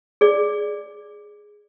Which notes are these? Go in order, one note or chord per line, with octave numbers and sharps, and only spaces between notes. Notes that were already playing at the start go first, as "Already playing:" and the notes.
G#4 D5